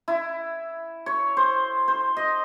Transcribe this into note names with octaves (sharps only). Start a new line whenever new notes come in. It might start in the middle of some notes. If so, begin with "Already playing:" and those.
E4
C#5
C5
C5
D#5